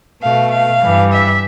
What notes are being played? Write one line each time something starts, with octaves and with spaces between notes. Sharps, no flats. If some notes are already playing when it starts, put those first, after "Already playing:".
B2 A3 F5
F5
G2 E3 G3
E5